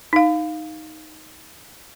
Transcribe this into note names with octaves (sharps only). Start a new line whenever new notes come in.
D#4 F5